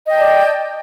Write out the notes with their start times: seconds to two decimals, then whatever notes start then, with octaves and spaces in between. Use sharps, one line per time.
0.06 D#5
0.10 G5
0.14 A5
0.19 D5